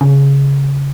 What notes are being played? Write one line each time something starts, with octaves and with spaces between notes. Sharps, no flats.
C#3